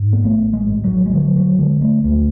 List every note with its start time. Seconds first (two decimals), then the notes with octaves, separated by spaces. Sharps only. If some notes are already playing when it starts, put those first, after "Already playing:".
Already playing: G#2
0.13 B3
0.23 A1 A3
0.53 G#3
0.68 A1
0.84 F#3
1.06 G#3
1.13 D3 F#3
1.36 F#3
1.58 D3 G#3
1.81 A3
2.04 D2 A3